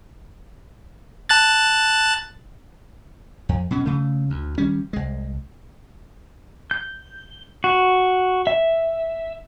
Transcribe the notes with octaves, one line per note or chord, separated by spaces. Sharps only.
A5 F#6 A6
F2
B2 F#3 C#4
C#3 A3
D2
D#3 G3 C#4
C2 G#3
G6
F#4
E5